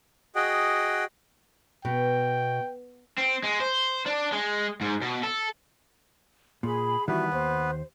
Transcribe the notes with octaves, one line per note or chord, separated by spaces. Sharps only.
F#4 G#4 D#5 F#5 G5
B2 G5
C4
G#3
C5
D4
G#3
G#2
B2
A4
A#2 G#4 B5
D#3 E3 G3 B3 F#4 B4 E5
D#2 C5